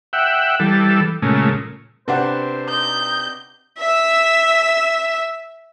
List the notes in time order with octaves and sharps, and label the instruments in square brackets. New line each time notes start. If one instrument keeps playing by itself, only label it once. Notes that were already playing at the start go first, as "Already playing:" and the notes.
[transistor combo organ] E5 F#5 G5
E3 G3 A4
A#2 C#3 G#3 A3
[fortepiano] C3 D4 [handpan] B4 F#5 [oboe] C5
[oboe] D#4 [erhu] G6
[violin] E5 E6